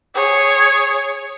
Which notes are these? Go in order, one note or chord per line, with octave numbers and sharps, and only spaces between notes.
G#4 C#5